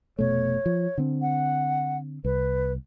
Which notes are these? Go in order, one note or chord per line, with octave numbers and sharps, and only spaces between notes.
F1 B2 A3 C#5
F3
D3 C4
F#5
C2 B4